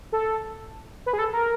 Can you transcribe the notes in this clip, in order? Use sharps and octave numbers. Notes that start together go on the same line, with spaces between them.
A4
B4
G#4
A4
A#4